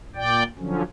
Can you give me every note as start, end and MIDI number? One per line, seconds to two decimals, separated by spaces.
0.16 0.43 46
0.16 0.43 74
0.16 0.43 79
0.59 0.82 50
0.59 0.82 53
0.59 0.82 54
0.59 0.82 61